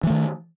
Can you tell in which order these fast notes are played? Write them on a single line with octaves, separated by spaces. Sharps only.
E3 A3 D#3